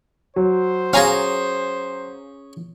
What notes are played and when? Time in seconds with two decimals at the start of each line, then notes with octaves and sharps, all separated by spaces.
0.36 F#3 C5
0.93 C#4 G#4 F5 G#5 A#5